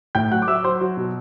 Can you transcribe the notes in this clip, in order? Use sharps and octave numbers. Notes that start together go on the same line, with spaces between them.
A2 G5 G6
F#3 F#5 F#6
D6
F#3 E5 E6
F#3 C5 C6
F#3
B2